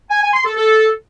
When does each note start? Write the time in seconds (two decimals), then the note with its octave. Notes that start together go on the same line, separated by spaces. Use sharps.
0.10 G#5
0.22 G#5
0.34 C6
0.45 A4
0.57 A4